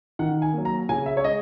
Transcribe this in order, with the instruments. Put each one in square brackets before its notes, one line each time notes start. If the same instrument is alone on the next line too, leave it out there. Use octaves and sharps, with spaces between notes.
[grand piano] D#3 F#5
G#5
F#3 A#3
A#5
C#3 G#5
E5
C#5
G#3 D#5